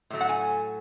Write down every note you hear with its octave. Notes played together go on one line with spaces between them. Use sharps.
A2 F#3 A3
F#5
G#5